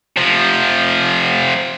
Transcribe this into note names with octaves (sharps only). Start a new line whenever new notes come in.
C3 F3